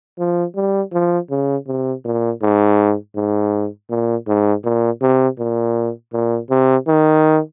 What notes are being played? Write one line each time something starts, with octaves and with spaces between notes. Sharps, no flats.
F3
G3
F3
C#3
C3
A#2
G#2
G#2
A#2
G#2
A#2
C3
A#2
A#2
C3
D#3